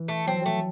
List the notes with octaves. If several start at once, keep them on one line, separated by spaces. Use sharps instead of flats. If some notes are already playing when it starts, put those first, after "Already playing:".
Already playing: E3
A3
F#3 C4
F3
F#3 A3